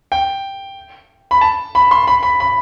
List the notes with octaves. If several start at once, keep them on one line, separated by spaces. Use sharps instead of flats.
G5
B5
A5
B5
C6
B5
B5
B5